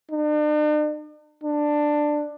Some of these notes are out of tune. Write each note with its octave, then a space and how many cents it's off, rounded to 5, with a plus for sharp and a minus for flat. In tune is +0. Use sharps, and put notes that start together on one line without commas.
D4 +45
D4 +10